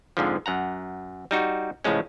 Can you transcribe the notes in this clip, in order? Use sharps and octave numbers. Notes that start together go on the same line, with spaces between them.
F2 G#2 D3 F3
F#2 F#5 A#5
G3 D#4 F#4
C#2 A2 F3 G#3 C#4